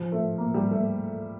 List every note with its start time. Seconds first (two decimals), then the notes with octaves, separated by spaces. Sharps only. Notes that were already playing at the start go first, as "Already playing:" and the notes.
Already playing: F3
0.12 A3
0.38 A#3
0.54 G3
0.71 A3